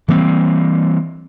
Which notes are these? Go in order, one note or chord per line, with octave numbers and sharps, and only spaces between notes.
E3 G3 A#3 C4